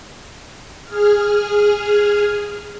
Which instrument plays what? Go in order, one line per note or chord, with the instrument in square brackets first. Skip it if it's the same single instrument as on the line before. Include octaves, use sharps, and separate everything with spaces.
[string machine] G#4 F6